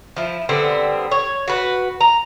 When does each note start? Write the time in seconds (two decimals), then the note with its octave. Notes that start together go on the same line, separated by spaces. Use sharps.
0.17 F3 E4
0.49 D3 G3 B3 C4
1.11 C#5
1.48 F#4 B4
2.01 A#5